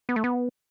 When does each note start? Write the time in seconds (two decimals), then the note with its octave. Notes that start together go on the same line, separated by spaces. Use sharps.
0.09 B3
0.16 A3
0.24 B3